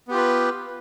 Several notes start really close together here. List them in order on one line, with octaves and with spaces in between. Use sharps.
B3 G4 F4 B4